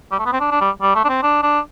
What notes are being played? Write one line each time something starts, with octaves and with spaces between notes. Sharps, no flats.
G3
A3
B3
C4
D4
D4
G3
G3
A3
D4
C4
D4
D4